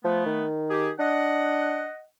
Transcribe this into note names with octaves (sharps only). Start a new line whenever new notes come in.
F3 A3 B3
D#3
G4 G#4
D4 D#5 F#5